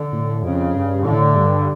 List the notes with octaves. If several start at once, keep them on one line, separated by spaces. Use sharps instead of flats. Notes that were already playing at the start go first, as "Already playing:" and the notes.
Already playing: D3
A2
F2 C#3
G2
A2 D3
G2